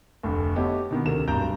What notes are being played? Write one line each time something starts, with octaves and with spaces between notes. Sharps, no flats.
F1 D2
A3 B3 D#4 G4 C#5
B2 D#3 B3
D2 C3 A#4 E7
D1 B1 G2 A#5 G6 D7